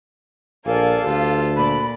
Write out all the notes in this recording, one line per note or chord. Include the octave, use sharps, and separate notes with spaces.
A#1 A4 A#4 D5 F5 G#5
D2 F4 G4 B4
A#2 D5 B5